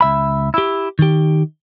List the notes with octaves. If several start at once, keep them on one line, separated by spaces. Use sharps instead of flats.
C#2 E5 B5
E4 G4
D#3 G4